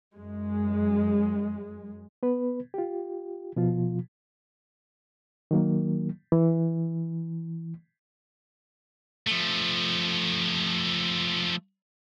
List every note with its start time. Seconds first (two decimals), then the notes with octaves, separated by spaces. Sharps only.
0.16 F#2 G#3
2.23 B3 B4
2.74 F4 G4
3.56 B2 F3 F4
5.51 D#3 F#3 A#3
6.32 E3
9.27 F3 A3